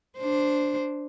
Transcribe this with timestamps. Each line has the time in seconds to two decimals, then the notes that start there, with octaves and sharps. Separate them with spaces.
0.18 D4 C5